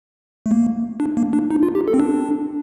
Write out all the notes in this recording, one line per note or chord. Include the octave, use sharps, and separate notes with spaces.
A3
A#3
D4
A#3
D4
D#4
F4
G4
A4
C4
D4